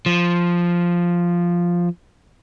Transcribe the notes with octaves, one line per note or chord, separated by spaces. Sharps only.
F3